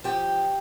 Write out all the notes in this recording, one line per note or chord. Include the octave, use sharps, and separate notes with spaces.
F3 G4 G5